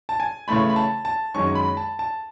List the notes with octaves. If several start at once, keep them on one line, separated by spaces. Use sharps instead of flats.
A5
G#5
C#3 E3 A3 B5
B5
A5
A5
F#2 D#3 G#3 C#4 C#6
B5
A5
A5